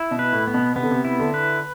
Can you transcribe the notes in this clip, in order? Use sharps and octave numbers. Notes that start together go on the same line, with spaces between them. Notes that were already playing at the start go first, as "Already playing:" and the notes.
Already playing: E4
B2
B4
A2
B3
B2
C3 B3
D3
C3
E4
D3
B4